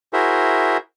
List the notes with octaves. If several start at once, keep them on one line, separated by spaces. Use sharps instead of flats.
E4 F#4 G#4 A#4 C5 E5